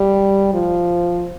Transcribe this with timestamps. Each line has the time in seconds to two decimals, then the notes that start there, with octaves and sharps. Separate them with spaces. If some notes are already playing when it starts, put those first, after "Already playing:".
Already playing: G3
0.54 F3